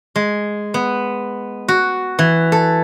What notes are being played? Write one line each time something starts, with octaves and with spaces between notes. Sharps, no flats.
G#3
B3
F#4
E3
A4